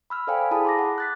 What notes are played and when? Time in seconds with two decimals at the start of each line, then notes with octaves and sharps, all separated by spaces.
0.10 B5 E6 F6
0.27 A4 C5 D5 F5 G5 G#5
0.51 E4 G#4 A5 B5 D#6
0.65 C6 D6 A#6
0.79 F#5
0.98 F#6 A6 B6